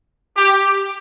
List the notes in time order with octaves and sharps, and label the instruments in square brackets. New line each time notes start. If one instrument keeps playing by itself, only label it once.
[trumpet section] G4